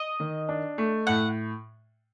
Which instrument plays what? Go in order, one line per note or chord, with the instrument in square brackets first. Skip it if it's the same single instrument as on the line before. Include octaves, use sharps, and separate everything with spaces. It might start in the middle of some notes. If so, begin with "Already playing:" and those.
Already playing: [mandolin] D#5
[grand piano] D#3
D4
A3
[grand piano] A2 [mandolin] F#5